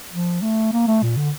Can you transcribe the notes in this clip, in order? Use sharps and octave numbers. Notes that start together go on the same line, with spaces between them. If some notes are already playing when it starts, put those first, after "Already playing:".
F3
A3
A#3
A3
A#2
D3